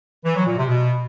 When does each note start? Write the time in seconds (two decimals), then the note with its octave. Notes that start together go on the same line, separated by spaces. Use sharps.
0.25 E3
0.36 F#3
0.46 A#2
0.57 C3
0.68 B2